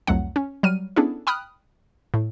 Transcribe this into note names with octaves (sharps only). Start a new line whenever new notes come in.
C2 F2 F#3 A3 F#5
C#4
F#3 G3 F6 D#7
B3 C#4 D4 E4 G#4 A4
G5 B5 D#6 F6 F#6
A2